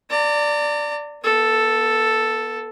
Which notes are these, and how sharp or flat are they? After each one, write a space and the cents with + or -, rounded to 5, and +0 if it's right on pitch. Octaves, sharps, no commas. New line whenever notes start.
D5 +0 A#5 -40
B3 -35 A4 +0